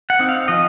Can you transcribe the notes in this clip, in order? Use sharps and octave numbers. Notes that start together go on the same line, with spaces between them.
F#5
C4 D#4
F5
F3 D#5